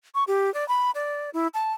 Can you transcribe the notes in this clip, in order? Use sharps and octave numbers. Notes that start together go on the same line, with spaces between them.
C#6
G4
D5
B5
D5
E4
A5